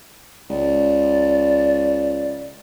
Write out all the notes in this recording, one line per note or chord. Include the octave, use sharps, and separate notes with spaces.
C#2 D5